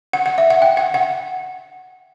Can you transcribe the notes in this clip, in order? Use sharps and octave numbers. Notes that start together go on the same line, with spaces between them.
F#5
F#5
E5
F#5
G5
F#5
F#5